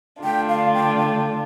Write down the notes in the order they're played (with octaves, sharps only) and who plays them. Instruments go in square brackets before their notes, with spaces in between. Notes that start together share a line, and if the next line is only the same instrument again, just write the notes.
[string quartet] D3 A3 D4 F4 [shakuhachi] G5
[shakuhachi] F5
G5
G5